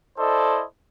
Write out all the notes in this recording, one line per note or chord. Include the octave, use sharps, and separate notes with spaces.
E4 A4 C5 D5 D#5